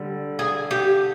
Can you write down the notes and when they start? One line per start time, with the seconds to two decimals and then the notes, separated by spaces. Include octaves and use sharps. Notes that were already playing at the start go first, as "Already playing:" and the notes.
Already playing: D3 G3
0.39 G#4
0.71 G4